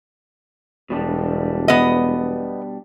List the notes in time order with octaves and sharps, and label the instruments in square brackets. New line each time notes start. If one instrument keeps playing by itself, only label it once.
[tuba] E1 [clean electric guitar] B2 G3 D4
[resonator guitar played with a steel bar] B3 D#5